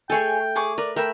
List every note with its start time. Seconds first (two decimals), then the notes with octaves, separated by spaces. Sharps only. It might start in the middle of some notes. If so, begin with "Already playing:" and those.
0.10 A3 G#4 A4 C#5 G5 G#5
0.56 G#4 C#6 D6
0.78 A#4 B4 D5
0.96 A3 A#4 E5 G5 B5